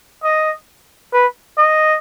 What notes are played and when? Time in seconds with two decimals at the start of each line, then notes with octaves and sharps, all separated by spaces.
0.24 D#5
1.13 B4
1.58 D#5